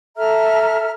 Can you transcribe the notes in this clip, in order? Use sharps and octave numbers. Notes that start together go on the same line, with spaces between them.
A4 E5 A#5 F6